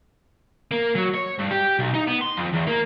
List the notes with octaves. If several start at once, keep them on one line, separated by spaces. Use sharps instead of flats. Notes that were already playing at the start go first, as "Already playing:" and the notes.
A#3
F#3
C#5
G2
G4
B1
D#4
B3
C6
F2
E2
A#3